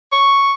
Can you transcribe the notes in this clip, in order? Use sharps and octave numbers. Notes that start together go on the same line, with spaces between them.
C#6